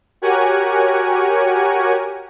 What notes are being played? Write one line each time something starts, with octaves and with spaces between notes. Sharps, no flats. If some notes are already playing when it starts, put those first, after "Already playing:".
F#4 G4 A#4 C#5 F#5 G#5